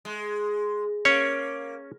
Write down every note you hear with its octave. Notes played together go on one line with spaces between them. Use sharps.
G#3
A#3 C#4 C#5